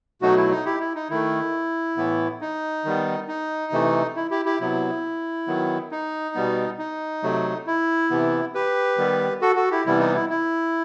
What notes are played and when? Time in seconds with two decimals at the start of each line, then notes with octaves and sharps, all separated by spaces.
0.22 B2 F#3 A3 D#4 F#4
0.37 E4
0.51 D#4
0.65 E4 G4
0.80 E4
0.95 D#4
1.10 D#3 A3 E4
1.97 A2 E3 B3
2.41 D#4
2.85 D#3 G3 B3
3.28 D#4
3.72 C3 E3 A3
4.16 E4
4.31 E4 G4
4.45 E4 G4
4.60 C3 F#3 B3 E4
5.47 D#3 F#3 B3
5.91 D#4
6.35 B2 G3 B3
6.79 D#4
7.23 C3 F#3 A3
7.67 E4
8.10 C3 E3 B3
8.55 G4 B4
8.98 D#3 G3 B3
9.42 F#4 A4
9.56 F#4 A4
9.71 E4 G4
9.86 C3 E3 G3 B3 E4
10.00 D#4
10.15 E4
10.30 E4